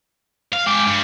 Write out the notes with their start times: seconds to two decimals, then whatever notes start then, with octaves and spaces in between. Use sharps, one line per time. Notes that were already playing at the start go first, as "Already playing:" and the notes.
0.53 F5 F6
0.66 G#3 G5 D6
0.87 G2